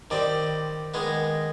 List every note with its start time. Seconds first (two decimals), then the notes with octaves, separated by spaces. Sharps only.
0.11 D#3 G3 C4 D5
0.94 D#3 G#3 B3